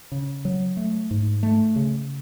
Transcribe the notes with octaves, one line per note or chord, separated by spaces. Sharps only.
C#3
F#3
A3
G#2
A3
C#3